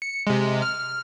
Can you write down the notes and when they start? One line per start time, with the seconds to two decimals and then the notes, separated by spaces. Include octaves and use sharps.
0.02 C#7
0.27 C3 G#3
0.62 F6